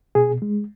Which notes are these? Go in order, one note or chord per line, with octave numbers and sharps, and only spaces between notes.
B2 G#4
G#3